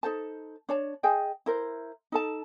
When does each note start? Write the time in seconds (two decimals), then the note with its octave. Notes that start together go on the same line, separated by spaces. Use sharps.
0.03 D#4 A4 C5 A5
0.69 D4 C#5 A5
1.03 G#4 D#5 G5 G#5
1.46 E4 A#4 C5
2.12 D#4 A4 A5